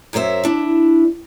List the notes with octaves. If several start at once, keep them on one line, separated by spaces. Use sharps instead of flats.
F#2 F#3 A#4 C5 E5
D4 E4